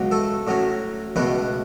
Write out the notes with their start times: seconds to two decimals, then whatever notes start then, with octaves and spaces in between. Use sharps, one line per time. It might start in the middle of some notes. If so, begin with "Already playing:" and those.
Already playing: C#2 B2 F#3
0.11 A3 A4
0.47 A2 F#3 C#4
1.16 C#2 B2 A3 B3 B4